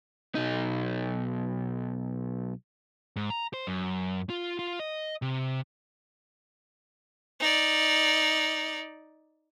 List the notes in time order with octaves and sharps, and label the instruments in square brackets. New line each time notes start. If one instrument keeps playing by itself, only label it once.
[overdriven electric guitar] B1 D#4
[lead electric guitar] G#2
A#5
C5
F#2
F4
F4
D#5
C3
[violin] D#4 D5